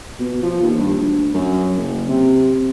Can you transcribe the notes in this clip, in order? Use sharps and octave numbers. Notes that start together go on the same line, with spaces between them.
B2
F3
D#2
G2
D2
F#2
F#1
C3